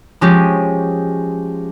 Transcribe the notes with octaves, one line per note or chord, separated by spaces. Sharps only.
F3 G#3 C#4 G4